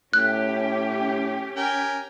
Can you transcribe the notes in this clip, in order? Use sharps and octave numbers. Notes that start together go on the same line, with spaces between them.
A2 C#4 G4 F#6
A#4 G5 G#5